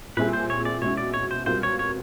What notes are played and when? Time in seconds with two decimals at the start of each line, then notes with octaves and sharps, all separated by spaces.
0.17 A#2 G3 C4 E4 G#4 B4
0.33 C5
0.50 C#5
0.65 D5
0.82 B2 G#3 C#4 E4 C#5
0.97 D5
1.14 C#5
1.31 C5
1.46 B2 G3 C4 F4 A#4 C5
1.63 C#5
1.79 C#5